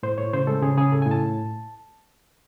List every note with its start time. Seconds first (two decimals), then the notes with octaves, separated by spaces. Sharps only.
0.03 A2 C5
0.18 A2 C#5
0.33 C#3 C5
0.47 G#3 A4
0.62 C#3 G#4
0.77 C#3 G#4
0.91 A2 A4
1.02 G#5
1.06 A2
1.11 A5